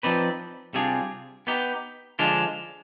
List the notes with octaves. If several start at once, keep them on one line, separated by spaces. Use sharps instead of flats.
F3 C4 D#4 B4 D5
C3 G3 D4 F4 G#4
B3 D#4 G4
D3 F3 G#3 D4 F4